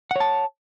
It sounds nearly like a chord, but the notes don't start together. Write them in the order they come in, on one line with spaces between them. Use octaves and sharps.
F#5 C#5 A5